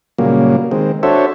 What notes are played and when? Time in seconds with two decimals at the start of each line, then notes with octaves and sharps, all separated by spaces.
0.18 A#2 C#3 F#3 G3 A#3
0.71 D#3 G#3 C4
1.03 D4 F#4 A4 C5 C#5 E5